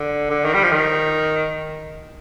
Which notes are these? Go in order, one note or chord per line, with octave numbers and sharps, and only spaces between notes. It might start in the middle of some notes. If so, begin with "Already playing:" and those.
Already playing: D3
D3
D#3
G3
F3
D#3